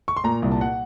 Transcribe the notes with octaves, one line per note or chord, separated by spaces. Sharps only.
C#6
C6
A#2 A#5
C2
A5
F#5